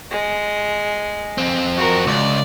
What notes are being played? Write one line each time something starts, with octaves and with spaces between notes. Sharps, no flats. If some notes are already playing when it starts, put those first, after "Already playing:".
G#3
F2 C4
F#4 A#4
C#2 D5